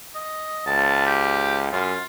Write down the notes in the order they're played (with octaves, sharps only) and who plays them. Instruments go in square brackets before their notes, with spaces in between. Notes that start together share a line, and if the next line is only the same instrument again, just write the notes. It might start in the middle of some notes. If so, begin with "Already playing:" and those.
[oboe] D#5
[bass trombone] C#2 [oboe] A5
[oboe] G4
[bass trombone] F#2 [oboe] F4